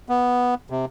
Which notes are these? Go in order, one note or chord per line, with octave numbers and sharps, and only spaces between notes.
B3
C3